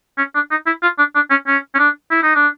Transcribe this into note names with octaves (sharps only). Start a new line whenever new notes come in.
C#4
D4
D#4
E4
F4
D4
D4
C#4
C#4
C#4
D4
E4
D#4
D4